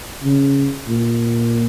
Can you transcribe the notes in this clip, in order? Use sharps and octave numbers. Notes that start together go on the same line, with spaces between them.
C#3
A#2